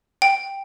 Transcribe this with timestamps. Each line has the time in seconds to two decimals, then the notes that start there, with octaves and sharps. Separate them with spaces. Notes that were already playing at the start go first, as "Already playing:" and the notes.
0.22 G5